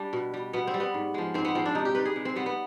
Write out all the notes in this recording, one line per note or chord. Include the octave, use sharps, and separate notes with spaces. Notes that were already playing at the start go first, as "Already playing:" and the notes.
Already playing: G3 D4
B2
G3
B2 B3
C4
G3
B3
G#2
F3 G#3
G#2 C4
B3
F3 G#3 C4
D4
C3 D#4
G4
G3 B4
G#4
C3
C4
G3 B3
B3